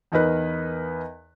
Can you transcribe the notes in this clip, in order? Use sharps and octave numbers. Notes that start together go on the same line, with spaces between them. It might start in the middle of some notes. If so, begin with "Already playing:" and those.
E2 D#4 A#4 B4 F#6